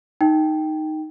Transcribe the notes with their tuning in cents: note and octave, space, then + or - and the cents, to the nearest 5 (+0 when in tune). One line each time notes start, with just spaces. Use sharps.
D#4 +0 G5 +0